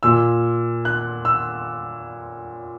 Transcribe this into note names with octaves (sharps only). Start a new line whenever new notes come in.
A#2 E6
F#6
E6